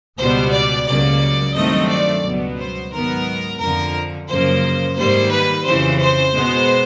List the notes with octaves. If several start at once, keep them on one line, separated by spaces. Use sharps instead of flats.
C#2 B2 G3 B3 C5
D5
C#2 C#3 F#3 A#3 D5
G2 D#3 F#3 A3 C4 D#5
D5
C#2 B2 F#3 B3
C5
G#2 D#3 F#3 B3 A#4
F2 D3 F3 A#4
F#2 C#3 F3 A#3 C5
G#2 D#3 G3 A#3 C5
B4
F2 C#3 E3 C5
C5
B2 G#3 B3